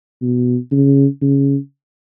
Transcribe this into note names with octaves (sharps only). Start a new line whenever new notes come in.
B2
C#3
C#3